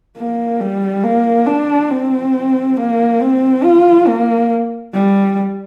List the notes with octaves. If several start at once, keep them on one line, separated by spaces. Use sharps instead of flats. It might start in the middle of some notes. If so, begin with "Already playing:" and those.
A#3
G3
A#3
D4
C4
A#3
C4
F4
A#3
G3